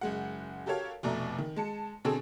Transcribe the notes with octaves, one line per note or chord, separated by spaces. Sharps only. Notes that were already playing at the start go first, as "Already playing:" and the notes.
F#1 G#3 F#5
F#4 G4 A4 A#4 C#5 F5
F1 B2 A3 D5 E5 A#5
D#3
G#3 A5 C#7
B2 D3 C4 G#4 A4